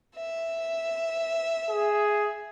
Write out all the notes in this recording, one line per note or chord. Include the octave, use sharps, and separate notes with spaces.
E5
G#4